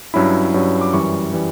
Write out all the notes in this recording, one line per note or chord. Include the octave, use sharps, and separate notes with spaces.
G2 F#3 C#4 E4 B5
G2 F#3 C#4 E4
D6
F#2 E3 G3 C#6
E3 G3